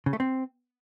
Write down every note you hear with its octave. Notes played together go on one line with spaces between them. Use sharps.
C#3
A3
C4